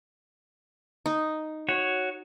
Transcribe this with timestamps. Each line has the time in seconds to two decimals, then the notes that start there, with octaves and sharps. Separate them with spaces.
1.06 D#4
1.69 F#4 C#5